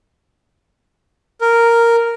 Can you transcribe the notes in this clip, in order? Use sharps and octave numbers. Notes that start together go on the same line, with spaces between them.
A#4